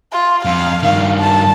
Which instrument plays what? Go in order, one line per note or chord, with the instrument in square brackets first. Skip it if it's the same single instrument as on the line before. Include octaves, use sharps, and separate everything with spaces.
[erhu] F4
[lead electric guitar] F2 [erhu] F5
[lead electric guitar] G2 D#3 [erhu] F5
[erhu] A5